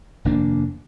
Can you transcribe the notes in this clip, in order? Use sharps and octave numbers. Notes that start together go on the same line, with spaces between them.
F1 D#2 A#3 D4